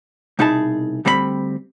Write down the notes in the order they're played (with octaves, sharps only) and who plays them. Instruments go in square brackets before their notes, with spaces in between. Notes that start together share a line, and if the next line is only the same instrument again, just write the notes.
[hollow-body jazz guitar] C2 B2 D#4 E4 G#4 A5
D2 G3 C4 A4 B5